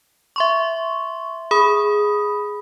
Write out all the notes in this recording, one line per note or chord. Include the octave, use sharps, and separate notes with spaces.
E5 C6 C#6
G#4 B5 D#6